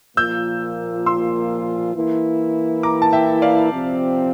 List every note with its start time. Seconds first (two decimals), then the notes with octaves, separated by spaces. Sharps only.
0.17 A#2 F3 A#3 F4 E6 G6
1.06 C6 E6
1.95 E3 A#3 E4
2.83 A#5 D6
3.02 A5
3.13 E5 G5
3.42 D5 F5
3.72 C3 F3 C4